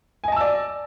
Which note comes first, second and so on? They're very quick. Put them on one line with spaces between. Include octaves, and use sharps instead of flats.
G#5 D#5 A5 E6 D5